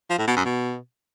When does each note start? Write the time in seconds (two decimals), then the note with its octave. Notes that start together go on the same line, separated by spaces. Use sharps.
0.10 F3
0.19 A2
0.28 B2
0.36 F#2
0.45 B2